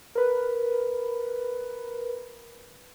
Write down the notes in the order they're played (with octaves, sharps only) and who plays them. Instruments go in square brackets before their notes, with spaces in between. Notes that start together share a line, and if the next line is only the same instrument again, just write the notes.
[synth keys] A#4 B4